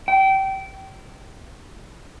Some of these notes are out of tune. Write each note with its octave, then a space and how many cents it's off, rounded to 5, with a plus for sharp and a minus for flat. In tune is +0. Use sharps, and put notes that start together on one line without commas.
G5 -25